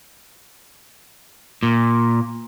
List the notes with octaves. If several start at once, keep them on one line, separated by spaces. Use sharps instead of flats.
A#2